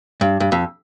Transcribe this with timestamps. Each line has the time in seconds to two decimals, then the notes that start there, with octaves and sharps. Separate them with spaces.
0.21 G2
0.40 G2
0.52 F2